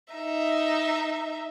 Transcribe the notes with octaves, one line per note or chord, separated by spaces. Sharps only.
D#4 E5